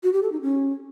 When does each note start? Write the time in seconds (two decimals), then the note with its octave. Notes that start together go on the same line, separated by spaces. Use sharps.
0.03 F#4
0.13 G4
0.23 A4
0.32 D#4
0.42 C#4